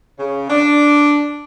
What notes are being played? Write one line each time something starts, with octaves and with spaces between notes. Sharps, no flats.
C#3
D4